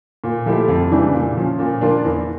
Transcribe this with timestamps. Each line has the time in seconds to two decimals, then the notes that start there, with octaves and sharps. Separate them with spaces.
0.24 A#2
0.46 F3 A3 E4 G4
0.68 F2
0.91 C#3 E3 G3 D4
1.13 A#2
1.37 F3 C#4
1.59 A#2
1.81 F3 A#3 D4 F4
2.05 E2